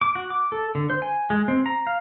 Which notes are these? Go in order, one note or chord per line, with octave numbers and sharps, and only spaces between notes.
D6
F#4
D6
A4
D3
C5
G#5
G#3
C4
A#5
F5